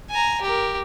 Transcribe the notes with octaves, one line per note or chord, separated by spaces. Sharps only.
G#5 A#5
G4 A#4